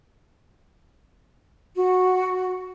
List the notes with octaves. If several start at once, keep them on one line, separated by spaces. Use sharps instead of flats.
F#4